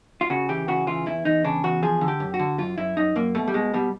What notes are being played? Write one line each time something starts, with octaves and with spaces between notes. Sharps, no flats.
F4
C#3 F#4
E3 G4
C#3 F#4
E3 F4
E2 E4
E2 D#4
C#3 D4
E2 F#4
F3 G#4
D3
G4
F#2
F#4
D3
F#2 F4
F#2 E4
F#2 D#4
F#2 A#3
B2 A3
G3
B2 G#3
B2 G3